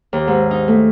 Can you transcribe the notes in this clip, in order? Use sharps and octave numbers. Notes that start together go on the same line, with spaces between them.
D#2
G#2
D#4
A3